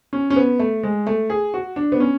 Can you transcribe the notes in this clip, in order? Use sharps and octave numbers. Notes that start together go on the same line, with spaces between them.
C#4
C#4
B3
A3
G#3
A3
G#4
F#4
D4
B3
C#4